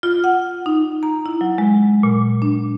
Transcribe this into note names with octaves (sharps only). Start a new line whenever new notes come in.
F4
F#5
D#4
A#5
E4
F#3
G#3
A#2
D4